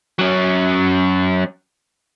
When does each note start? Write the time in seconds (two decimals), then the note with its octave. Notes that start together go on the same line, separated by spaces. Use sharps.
0.19 F#3 C#4